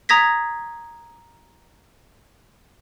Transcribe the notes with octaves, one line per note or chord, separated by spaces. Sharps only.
A#5 D#6 G#6 A#6 B6